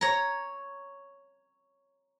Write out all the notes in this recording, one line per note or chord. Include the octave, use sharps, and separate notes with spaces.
C#5 A#5